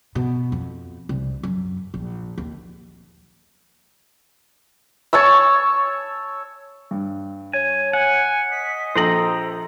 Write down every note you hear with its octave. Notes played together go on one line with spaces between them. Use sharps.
B2
F2
C2
F#2
A#1
D#2
C#5 A5 C#6 E6
G2
C#5 G#5
F#5 G#5
D#5 B6
A#1 A4 C5 G5 A#5 D#6 F#7